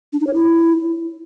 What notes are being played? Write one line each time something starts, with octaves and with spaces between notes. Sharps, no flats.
D4
D#4
C#5
E4